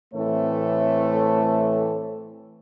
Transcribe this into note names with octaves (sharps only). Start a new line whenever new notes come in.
A2 E3 A3 C4 A4 C#5